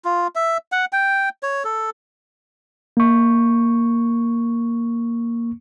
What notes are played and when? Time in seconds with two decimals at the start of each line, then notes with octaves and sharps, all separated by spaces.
0.05 F4
0.35 E5
0.72 F#5
0.93 G5
1.43 C#5
1.64 A4
2.97 A#3 C#6